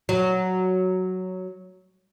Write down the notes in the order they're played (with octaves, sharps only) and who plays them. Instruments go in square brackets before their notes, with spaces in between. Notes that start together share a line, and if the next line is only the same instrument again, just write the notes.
[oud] F#3